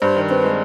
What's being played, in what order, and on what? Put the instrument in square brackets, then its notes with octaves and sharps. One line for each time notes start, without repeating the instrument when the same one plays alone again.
[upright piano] G2 [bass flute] C5
[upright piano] D#3
[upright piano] C4 [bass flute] B4
[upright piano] G#3